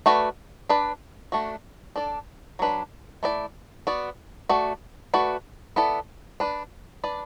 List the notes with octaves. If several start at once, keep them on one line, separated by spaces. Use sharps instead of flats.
A3 F#4 B4 D5
D4 B4 D5
A3 D4 F#4
D4 A4 D5
F#3 D4 B4
A3 E4 D5
B3 F#4 D5
A3 F#4 D5
A3 F#4 B4 D5
B3 E4 A4 D5
D4 B4 D5
D4 B4 D5